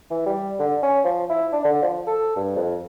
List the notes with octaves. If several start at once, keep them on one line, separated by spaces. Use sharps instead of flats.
E3
G3
D3
C#4
F3
E4
D4
D3
F3
A4
G2
F2